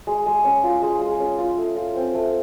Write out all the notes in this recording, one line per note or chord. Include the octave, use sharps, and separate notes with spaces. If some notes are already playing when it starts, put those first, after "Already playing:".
G#3
G#3
C#4
F4
G#3
G#3
C#4
F4
A3
F4
C4
A3